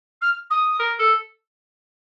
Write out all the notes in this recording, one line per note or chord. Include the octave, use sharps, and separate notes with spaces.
F6
D#6
A#4
A4